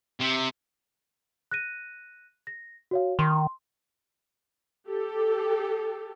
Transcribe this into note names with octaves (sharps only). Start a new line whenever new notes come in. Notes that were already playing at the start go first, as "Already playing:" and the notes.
C3
F#6 A#6 D#7
A#6
F#4 C#5 F5
D#3 C6
G4 A4